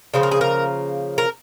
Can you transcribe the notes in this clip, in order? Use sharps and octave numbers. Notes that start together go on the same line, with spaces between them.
C#3 F3 A#3 C5
A#4
G#4
A#4
A#4